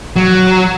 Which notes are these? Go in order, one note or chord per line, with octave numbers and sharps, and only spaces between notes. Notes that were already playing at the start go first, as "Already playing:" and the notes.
F#3